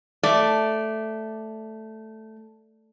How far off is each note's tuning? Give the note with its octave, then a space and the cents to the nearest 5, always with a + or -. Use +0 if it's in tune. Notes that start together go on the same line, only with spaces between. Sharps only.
A3 +0 D5 +0